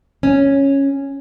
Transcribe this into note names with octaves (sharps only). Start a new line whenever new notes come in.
C#4